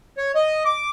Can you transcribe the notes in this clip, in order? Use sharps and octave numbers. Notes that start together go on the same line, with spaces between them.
C#5
D#5
D6